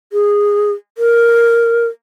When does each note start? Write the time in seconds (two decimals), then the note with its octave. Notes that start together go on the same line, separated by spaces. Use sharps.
0.13 G#4
0.98 A#4